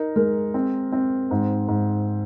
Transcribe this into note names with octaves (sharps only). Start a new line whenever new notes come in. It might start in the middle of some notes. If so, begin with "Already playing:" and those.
Already playing: D#4 A#4
G#3 A#4
C4
C4
G#2
G#2